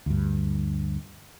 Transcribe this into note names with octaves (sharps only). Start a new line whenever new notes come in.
D2 G2